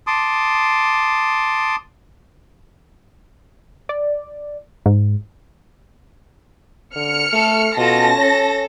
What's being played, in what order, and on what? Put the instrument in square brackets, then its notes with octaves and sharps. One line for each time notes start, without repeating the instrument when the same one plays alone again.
[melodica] A5 C6 D6 D#6
[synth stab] D5
G#2
[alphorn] D3 [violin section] F6 C#7
[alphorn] A3 [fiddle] A4
[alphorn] B2 [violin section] C#4 A5 A#6 [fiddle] F4 A4
[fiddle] A4 [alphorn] C#5